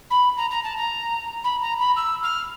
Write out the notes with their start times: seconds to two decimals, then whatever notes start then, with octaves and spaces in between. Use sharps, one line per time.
0.10 B5
0.37 A#5
0.51 A#5
0.64 A5
0.77 A#5
1.44 B5
1.61 A#5
1.79 B5
1.96 E6
2.23 F6